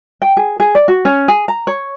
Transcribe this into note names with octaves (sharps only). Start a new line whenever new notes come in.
G5
G#4
G#4
D5
F#4
C#4
G#4
A#5
C#5